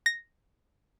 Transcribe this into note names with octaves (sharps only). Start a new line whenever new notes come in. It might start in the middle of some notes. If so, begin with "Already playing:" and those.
A#6